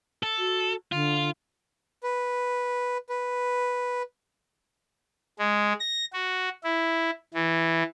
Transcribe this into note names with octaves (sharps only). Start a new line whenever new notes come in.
A4
F#4
D3 F4
B4
B4
G#3
A#6
F#4
E4
E3